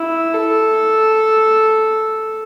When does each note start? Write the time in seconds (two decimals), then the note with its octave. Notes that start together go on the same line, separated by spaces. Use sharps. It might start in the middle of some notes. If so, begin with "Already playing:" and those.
Already playing: E4
0.34 A4